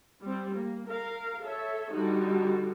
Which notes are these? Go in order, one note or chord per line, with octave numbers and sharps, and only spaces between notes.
G3 C4
A#3
A#4 F5
A4 C#5 E5
D3 G3 D#4 F#4